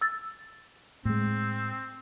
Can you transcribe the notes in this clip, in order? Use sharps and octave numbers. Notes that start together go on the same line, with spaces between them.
E6 A6
A2 G#3 C4